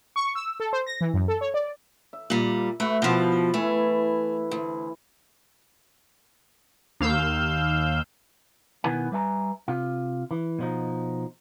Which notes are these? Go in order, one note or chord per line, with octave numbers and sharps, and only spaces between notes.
C#6
E6
A4
C5
A#6
E3
F#2
A4
C#5
D5
E5
A#2 G3
A3 F#4 B4
B2 F3 E4 F4
E3 A3 E4
D2
D#2 F5 E6 G6
B2 D#3 B3 E4 B4 G#5
G3 B4 E5 G#5 A#5
C3 F4
E3
B2 F3 D#4